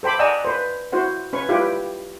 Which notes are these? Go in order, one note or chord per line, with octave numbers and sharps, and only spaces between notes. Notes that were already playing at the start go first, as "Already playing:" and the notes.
A4 C5 G5 B5 D6
D5 D#5 F#5 G#5 A#5 E6
B4 C5
E4 F#4 C5 F#5
C#4 B4 C#5 C#6
E4 F4 G4 B4 G5